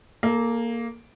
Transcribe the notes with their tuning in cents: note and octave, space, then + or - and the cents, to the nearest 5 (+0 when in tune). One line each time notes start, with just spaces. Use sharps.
A#3 +0 A4 -30